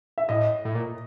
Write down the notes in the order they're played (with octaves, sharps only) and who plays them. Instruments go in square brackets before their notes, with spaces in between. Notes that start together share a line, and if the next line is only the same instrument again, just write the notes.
[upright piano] E5
[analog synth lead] A2 [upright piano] D#5
[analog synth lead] A2
A#2